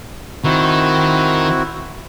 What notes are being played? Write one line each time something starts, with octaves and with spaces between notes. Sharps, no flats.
D#3 C4 E4 F#4